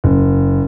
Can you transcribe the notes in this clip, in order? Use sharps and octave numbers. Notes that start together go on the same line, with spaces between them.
F#1